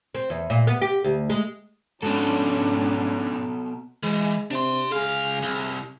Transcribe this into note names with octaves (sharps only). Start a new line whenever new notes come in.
C4
E2
A#2
B3
G4
D2
G#3
G#2 B3 C#4 D4 F#4 A4
E3 G#3
C3 D4 C6
C#2 G#4 F5
C2